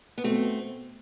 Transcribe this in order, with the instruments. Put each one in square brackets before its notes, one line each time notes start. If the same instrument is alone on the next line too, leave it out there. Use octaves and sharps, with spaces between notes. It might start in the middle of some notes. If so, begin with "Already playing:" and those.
[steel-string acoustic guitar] B3
[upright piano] B2 [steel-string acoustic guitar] A3 C4